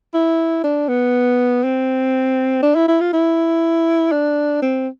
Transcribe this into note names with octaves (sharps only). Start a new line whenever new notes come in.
E4
D4
B3
C4
D4
E4
E4
F4
E4
D4
C4